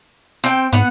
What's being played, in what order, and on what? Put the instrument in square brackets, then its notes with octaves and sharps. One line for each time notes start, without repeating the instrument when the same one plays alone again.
[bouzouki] C4 G5
[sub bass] G#2 [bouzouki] B3 F#5